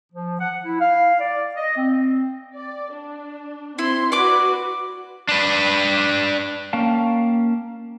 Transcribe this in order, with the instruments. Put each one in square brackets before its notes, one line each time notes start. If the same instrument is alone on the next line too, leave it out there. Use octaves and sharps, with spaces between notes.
[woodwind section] F3
F#5
E4
F5
D5
D#5
C4
[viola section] D5
D4
[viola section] C4 C6 [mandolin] E4
[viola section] F#4 B4 [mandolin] D5 D6
[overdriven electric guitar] D4 B4
[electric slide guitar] A#3 C#4 F5 G5 A5